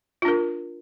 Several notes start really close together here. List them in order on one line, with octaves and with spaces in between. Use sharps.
F4 D4 A#4